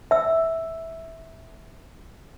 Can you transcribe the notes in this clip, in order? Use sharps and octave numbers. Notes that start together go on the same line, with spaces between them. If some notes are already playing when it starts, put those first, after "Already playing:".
E5 E6